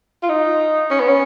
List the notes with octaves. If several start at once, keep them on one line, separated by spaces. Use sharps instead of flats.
F4
D#4
C#4
B3
C#4